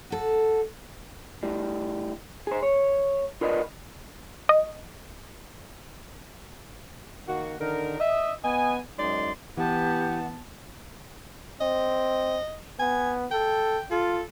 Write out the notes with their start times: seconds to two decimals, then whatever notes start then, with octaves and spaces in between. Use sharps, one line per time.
0.10 F#4 A4
1.43 A2 G3
2.47 G#4 C5
2.63 C#5
3.41 F4 A#4 B4 D5 D#5
4.49 D#5
7.27 D#3 A#3 F#4
7.59 D3 D#3 A#4
7.99 D#5 E5
8.43 B3 D#5 G#5
8.97 F#2 G#3 D#4 D5 C6
9.57 E3 B3 G4 F#5 A5
11.61 C4 D#5
12.80 B3 G#5
13.31 A4 G5
13.91 F4 A4